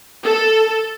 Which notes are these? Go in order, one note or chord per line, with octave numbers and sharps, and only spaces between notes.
A4